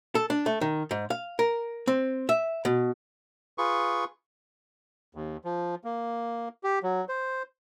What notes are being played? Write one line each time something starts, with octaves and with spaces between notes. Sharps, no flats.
A4
D4
A3
D#3
G#2
F5
A#4
C4
E5
B2
F4 G#4 B4 C#6
D#2
F3
A#3
G4
F#3
C5